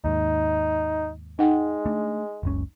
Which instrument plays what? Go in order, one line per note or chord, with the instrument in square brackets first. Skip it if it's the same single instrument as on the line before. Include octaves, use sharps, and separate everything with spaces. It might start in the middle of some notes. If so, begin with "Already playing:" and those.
[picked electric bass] D#2 G#2 [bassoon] D#4
[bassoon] G#3 [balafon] D#4 F#5 G5
[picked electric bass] A3 D4
F#1 C#2 C#4